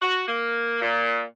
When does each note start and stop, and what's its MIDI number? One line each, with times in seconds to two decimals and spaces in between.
0.01 0.23 66
0.27 0.80 58
0.81 1.21 46